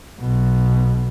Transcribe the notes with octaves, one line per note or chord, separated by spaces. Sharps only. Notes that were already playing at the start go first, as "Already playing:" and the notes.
B1 B2